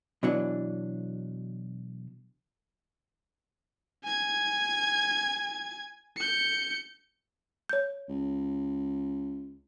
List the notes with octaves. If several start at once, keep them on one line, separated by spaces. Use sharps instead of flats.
B2 E3 F#3 D4
G#5 G#6
G6 C#7
C#5 G6
C#2